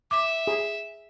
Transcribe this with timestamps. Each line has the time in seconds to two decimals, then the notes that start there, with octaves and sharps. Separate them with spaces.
0.11 E5 D6
0.47 G#4